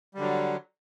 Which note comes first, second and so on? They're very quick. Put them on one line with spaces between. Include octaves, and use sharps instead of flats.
G3 D3 F#3